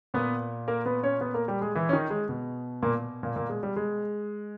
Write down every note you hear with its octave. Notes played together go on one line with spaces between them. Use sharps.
A#2 B3 B4
A#3 A#4
B3 B4
C#4 C#5
B3 B4
A#3 A#4
G3 G4
G#3 G#4
E3 E4
C#4
D#3 D#4
G#3
B2
A#2 A#3
A#2 A#3
A#2 A#3
G#3
G3
G#3